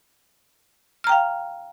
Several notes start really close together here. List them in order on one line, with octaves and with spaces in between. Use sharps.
F6 A#5 G5 F5